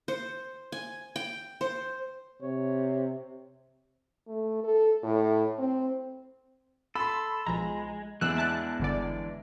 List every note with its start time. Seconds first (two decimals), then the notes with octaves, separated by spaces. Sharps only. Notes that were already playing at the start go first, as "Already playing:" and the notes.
0.08 C5
0.72 G#5
1.16 G5
1.61 C5
2.42 C3 C#5
4.28 A3
4.64 A4
5.03 A2
5.59 C4
6.95 A4 B5 C6
7.47 B1 F3 G#3 A#5
8.21 E2 E3 G#3 D4 E6 F#6
8.37 E5 A5 F#6
8.80 G1 D3 D5